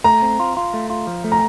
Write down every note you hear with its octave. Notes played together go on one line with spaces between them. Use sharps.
A3 A#5
C4
F4
F4
A3
F4
F3
A3
A#5